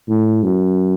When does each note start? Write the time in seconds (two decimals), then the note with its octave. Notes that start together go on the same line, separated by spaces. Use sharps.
0.09 A2
0.43 F#2